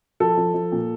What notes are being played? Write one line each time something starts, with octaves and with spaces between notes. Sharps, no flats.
F3 A4
F3
F3
A#2